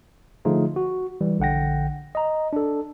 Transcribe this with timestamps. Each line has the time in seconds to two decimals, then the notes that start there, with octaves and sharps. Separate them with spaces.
0.45 D3 F3 A3 D#4 F4 G#4
0.76 F#4
1.21 E3 G3
1.39 A#1 D3 F#5 G5 A#6
2.15 D#5 A#5
2.53 D4 A4